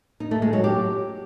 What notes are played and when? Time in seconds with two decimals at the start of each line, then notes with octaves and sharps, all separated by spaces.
0.20 D#4
0.31 A3
0.42 G#3
0.53 F#3
0.64 G4